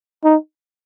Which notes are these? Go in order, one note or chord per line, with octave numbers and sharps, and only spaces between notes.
D#4